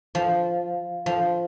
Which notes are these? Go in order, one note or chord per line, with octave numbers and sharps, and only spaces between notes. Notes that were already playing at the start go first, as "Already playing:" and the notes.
F3
F3